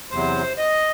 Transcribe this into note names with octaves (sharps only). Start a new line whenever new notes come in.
E2 C3 F#3 C5
D#5